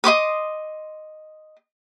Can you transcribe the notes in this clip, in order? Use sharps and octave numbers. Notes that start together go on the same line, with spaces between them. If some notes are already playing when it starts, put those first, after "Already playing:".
D#5 C6 D6 D#6